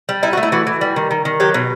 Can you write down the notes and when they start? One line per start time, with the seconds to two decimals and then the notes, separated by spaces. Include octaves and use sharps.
0.09 G3
0.23 D#4 E4
0.33 F#4
0.37 A3
0.43 E4
0.52 E3 F#4
0.67 E3
0.81 G3
0.96 D#3
1.11 D#3
1.25 D#3
1.40 F#3 G4
1.54 B2